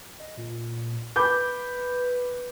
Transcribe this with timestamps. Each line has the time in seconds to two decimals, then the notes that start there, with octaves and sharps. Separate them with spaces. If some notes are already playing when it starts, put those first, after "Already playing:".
0.19 D#5
0.38 A#2
1.16 B4 B5 D6 G6